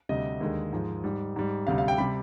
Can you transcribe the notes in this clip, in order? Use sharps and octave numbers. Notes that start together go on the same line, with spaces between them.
D2 C3 G3 D#5
D#2 D3 G#3
G#2 F3 G#3
G#2 G3
G#2 G3
D2 C3 G3 F5
F5
G5
C3 G3 B5